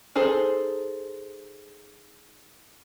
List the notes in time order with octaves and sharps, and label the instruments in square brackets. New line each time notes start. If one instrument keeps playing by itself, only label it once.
[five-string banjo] D#4 G#4 A4 C5